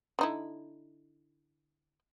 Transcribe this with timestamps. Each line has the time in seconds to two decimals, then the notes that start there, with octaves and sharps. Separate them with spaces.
0.19 D3 D#4 E4